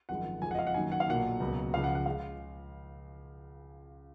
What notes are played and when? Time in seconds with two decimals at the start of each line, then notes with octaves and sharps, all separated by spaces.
0.09 G#1 F#2 F3 G#3 F#5
0.42 F#1 F2 F3 G#3 G#5
0.51 F#5
0.55 D#5
0.59 F5
0.67 F#5
0.74 F#2 D#3 F#3 A#3 G#5
0.92 F#5
1.00 F5
1.07 B1 A#2 F#3 A#3 F#5
1.40 C#2 B2 F#3 A#3
1.73 C#2 C#3 F3 F5
1.84 F#5
1.95 F#5
2.06 C#3 G#3 F5